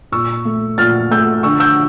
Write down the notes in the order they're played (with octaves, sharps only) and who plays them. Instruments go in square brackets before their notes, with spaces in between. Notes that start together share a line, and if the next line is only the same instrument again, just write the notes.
[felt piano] A#2 C#6 E6
A3
A#2 F6 A6
A3 E6 G6
D3 C#6 E6
E6 G6